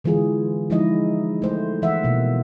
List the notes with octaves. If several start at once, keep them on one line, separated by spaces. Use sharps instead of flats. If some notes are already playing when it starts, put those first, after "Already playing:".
D3 E3 G#3 F4 G#4
F3 G#3 D#4 E4 D#5
A3 C5
E3 E5 F#5
B2 A#3